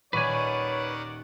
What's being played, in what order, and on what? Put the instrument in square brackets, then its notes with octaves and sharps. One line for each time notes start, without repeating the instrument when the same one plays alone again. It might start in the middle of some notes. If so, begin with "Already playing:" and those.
[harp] D#1 C#6 [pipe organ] D#3 D5 F#5 [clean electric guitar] B4 G#5 [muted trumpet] C#5